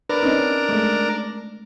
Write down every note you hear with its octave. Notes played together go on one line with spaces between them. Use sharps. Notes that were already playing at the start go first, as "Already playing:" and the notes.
D4 A#4 B4
C4 C#4 D#4
G#3 A3